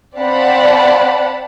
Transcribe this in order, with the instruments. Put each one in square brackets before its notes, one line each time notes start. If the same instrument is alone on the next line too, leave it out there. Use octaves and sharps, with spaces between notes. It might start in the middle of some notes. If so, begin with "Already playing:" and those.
[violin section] C4 D5 F5 F#5 A5 B5